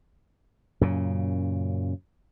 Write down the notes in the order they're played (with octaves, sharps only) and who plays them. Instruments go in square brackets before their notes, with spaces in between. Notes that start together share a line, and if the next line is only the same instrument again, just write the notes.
[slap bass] F#2 A#2 C#3